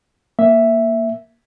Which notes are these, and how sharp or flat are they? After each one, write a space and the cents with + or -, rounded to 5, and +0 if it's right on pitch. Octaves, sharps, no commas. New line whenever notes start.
A#3 +0 E5 +0